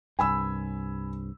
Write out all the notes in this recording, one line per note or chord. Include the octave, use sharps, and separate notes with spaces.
C2 G2 G#5 B5 E6